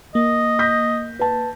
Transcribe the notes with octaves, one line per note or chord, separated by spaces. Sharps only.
A#3 D#5
G6 A#6 B6
B4 A5